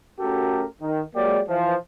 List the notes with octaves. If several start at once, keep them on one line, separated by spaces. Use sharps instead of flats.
A3 C#4 F#4 G4 A4 A#4
D#3
F#3 G#3 A#3 G4 D5
E3 F3